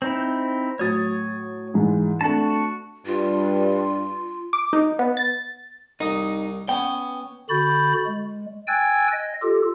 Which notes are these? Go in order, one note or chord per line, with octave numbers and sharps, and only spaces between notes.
C4 D#4 E4
A2 F#3 C#5 D#6 A6
G#2 E3 G#3
A3 C4 D4 F#4 A5
G2 F4
D6
D#4
B3
A6
C2 D#4 D#5
B3 C#4 G5
D3 F#4 B5 G6 A6
G#3
G5 G#5 E6 F#6 G#6 A6
D#5
F4 G4 A4